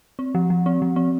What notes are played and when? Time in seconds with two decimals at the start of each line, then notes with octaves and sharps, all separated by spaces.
0.19 C4
0.35 F3
0.50 F3
0.66 C4
0.82 F3
0.96 C4